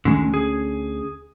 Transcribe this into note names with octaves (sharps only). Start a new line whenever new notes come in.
D2 D3 D#3 G#3 C#4
G#4